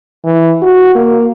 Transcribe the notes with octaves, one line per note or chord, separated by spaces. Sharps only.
E3
F#4
A#3